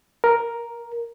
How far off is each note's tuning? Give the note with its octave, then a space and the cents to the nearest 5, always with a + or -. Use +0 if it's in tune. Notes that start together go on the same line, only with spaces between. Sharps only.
A#4 +5